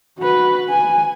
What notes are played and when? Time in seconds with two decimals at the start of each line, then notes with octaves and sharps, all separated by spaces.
0.19 F#4 B4
0.70 G#5